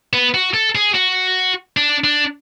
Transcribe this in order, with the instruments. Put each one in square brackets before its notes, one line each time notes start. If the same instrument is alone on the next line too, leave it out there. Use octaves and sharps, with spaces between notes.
[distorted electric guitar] B3
F#4
A4
G#4
F#4
D4
D4